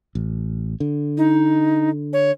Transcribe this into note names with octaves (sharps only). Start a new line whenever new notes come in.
A1
D3
D#4
C#5